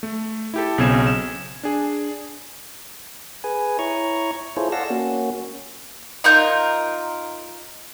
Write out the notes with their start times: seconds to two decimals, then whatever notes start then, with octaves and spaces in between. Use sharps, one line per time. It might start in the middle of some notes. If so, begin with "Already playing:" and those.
0.03 A3
0.54 E4 G4 A4
0.78 B1 C#3 C4 G#5 G#6 E7
1.07 E7
1.63 D4 G#4
3.44 G#4 B4 G#5
3.79 E4 C#5 A#5 C#6
4.57 E4 F4 G#4 A4 C5 C#5
4.72 A4 D5 F5 F#5 E6 A#6
4.90 A#3 C#4 F#4
6.24 D#4 F4 A#4 G6